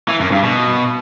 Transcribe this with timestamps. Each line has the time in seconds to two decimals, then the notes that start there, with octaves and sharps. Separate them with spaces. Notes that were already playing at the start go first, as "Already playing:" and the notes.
0.09 E3
0.20 F#2
0.32 G2
0.43 B2